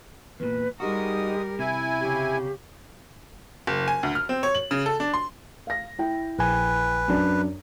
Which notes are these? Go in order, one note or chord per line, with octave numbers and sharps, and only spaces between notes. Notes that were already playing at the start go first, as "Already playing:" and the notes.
E2 A#2 B4
G3 G#3 D#4 F#4 G4 A#4 D#6
C3 E4 G#5
C#3 G4
F#1
G#5
D2
F6
C4
C#5
F#7
C#3
A4
D4
C6
F5 A#6
E4 G5
A#1 B4 G#5
F#2 D4